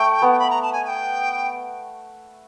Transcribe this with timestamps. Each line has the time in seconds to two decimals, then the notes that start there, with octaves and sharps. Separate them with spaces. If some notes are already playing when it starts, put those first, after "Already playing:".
Already playing: A3 G5
0.22 B3
0.39 B5
0.50 A#5
0.63 A5
0.73 G#5
0.85 G#5
0.88 G5